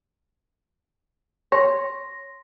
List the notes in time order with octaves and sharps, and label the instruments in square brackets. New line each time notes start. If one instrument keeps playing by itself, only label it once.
[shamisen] C#5 [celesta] C6 A#6